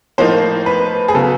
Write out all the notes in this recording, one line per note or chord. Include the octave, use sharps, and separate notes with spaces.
A2 F3 A#3 D#4 C5
B4
G#4
C#3 F#3 B3 A4